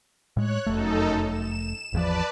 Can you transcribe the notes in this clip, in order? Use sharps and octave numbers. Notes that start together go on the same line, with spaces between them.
A2 G#3 C#5 F#6
F1 F#2 A3 D#4 A4
E7
G#1 E2 F3 B4 D5 A5